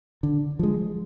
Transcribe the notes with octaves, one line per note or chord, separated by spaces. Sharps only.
D3
F3 G#3